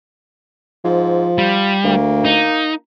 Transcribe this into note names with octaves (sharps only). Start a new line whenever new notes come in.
G#2 F3
G3 F4
D2 A#3
D#4